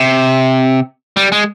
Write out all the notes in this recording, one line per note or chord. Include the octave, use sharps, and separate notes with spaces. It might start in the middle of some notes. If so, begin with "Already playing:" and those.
Already playing: C3
G3
G#3